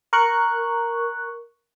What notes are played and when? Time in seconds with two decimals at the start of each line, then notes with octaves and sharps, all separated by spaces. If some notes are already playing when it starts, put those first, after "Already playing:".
0.13 A#4 C#6 F#6